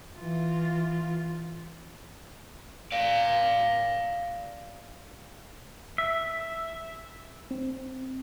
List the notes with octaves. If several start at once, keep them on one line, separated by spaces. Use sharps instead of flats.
E3 F4
D5 F5
E5
C4